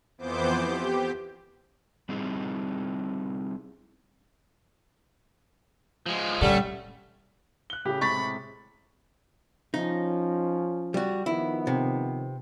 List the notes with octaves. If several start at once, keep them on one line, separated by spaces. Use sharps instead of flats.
F2 E3 B3 C5 D6 G6
G4
G3 C4 D#4 E4 G#4
F3 G#3
A#2 D3 G3 A3 C#4
F#6 G7
A2 C#3 G4
A2 C3 G#3 B5 C#6 A6 B6
F3 C#4 D#4
G3 F#4
D#3 F3 B3 E4
C3